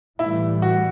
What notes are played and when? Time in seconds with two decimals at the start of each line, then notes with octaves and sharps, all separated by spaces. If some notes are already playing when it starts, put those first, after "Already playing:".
0.19 A2 E3 G3 E4
0.62 F#4